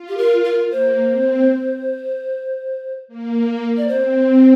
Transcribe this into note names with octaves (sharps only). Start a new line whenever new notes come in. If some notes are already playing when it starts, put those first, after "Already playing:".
Already playing: F4
G4
A#4
A#4
A#3 C5
C4
A#3
D5
C4 C5